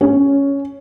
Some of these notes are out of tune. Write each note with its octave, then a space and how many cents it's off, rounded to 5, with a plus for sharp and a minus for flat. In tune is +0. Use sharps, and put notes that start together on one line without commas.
C#4 +5